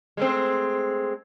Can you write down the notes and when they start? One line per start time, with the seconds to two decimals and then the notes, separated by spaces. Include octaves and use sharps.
0.17 G#3 A3 C4